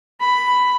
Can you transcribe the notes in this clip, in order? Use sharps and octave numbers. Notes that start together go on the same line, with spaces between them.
B5